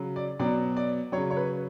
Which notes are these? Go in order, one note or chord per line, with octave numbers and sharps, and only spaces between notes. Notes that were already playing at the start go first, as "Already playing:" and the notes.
Already playing: C#3 F#3
D5
B2 F#3 D5
D5
C#3 F#3 C#5
C#5
B4